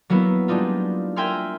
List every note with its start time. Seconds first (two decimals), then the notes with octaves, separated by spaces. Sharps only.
0.10 F#3 A#3 B3 E4
0.48 G3 G#3 D4 D#4 F4
1.16 A#4 E5 G5 G#5 C6 F6